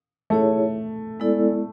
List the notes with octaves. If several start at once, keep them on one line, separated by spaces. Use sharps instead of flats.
A3 E4 G#4 C#5
G#3 B3 E4 A4 D5